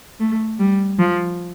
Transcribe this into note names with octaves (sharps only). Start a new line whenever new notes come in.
A3
G3
F3